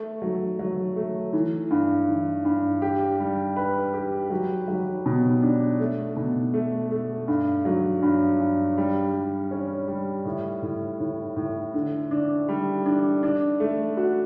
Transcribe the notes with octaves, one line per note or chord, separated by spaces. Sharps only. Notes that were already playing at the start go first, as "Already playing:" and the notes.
Already playing: A3
F#3
F#3
A3
E3
G2
E3
G2
G4
G3
B4
G4
F#3
F#3
B2
D4
A3
B2
A3
A3
G2
F#3
G2
G2
G3
G3
C#4
G3
A2
A2
A2
A2
D3
D4
G3
D4
D4
A3
F#4